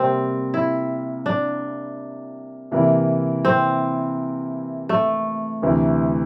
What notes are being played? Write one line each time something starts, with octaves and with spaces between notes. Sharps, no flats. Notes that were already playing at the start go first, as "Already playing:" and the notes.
Already playing: C3 G3 A#3 C4
E4
D4
C3 E3 A#3 E4
C4
A3
D2 C3 E3